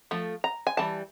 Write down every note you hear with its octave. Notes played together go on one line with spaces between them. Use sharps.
F3 A3
A#5
G#5
E3 G3 A5